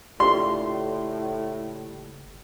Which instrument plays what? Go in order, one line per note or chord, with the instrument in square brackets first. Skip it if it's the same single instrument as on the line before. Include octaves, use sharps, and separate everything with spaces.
[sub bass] F#1 [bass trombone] A2 [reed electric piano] F4 G4 D5 [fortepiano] C6